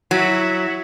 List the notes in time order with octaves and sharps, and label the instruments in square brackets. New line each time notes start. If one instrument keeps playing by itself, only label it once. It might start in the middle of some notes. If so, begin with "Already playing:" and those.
[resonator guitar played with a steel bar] F#3 [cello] E4 F#4